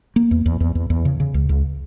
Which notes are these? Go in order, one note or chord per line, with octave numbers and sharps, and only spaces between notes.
A#3
E2
E2
E2
E2
E2
C#3
C#3
C#2
C#2